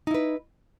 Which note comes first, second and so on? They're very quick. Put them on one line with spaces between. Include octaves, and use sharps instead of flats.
D#4 E4 B4